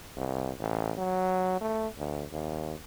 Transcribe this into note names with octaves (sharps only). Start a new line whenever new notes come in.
C2
A1
F#3
A3
D2
D#2